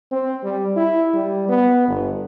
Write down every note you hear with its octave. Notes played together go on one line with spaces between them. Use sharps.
C4
G3
E4
G3
B3
G1